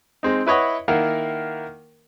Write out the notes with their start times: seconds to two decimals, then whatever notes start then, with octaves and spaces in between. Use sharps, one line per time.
0.23 G#3 C4 D#4
0.46 E4 B4 C#5 D#5 F#5
0.88 D#3 A#3 E4 A#4 F5 F#5